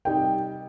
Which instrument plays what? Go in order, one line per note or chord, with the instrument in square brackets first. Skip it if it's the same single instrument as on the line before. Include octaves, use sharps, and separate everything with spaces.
[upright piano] C3 G3 D#4 A#4 [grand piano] G5